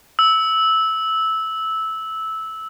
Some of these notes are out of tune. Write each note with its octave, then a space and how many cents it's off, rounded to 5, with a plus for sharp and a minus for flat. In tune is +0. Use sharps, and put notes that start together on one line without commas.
E6 -15